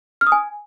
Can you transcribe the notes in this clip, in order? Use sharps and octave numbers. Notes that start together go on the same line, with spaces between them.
F6
D#6
G#5